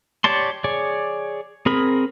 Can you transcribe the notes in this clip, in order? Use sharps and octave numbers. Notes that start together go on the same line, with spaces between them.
G4 C#5 D5 A5 C6
G#4 C#5 D5
C4 G#4 A#4 B5